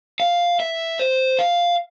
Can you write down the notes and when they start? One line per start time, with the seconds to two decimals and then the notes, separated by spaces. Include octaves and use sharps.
0.20 F5
0.60 E5
0.99 C5
1.39 F5